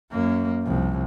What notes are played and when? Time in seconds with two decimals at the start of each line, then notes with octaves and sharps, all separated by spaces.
0.13 F#2 A#3
0.63 C2 F3